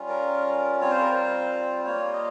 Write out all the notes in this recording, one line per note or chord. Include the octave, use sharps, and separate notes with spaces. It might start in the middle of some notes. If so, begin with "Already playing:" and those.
Already playing: G3 C#4 F4
A#4
G3 C4 F4 C#5
C5
A#4
C5
G3 A#3 F4 C#5
D#5